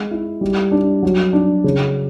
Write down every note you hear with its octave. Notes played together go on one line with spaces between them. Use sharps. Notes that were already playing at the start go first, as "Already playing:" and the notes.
Already playing: G#3
E4
G3
D4
F#3
D4
C#3